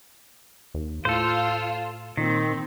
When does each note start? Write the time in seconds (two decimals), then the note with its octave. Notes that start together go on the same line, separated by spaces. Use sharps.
0.74 D#2
1.05 A2 F4 A4 C5
2.17 A#2 D#3 C4